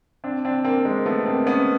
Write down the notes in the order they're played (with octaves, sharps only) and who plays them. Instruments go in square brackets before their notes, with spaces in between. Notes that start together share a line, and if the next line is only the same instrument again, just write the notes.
[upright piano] C4 D4
C4 D4
A#3 C4
G#3 A#3
A3 B3
A#3 C4
B3 C#4